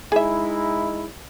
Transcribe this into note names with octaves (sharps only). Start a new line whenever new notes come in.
G#3 D#4 E4 G#4 E5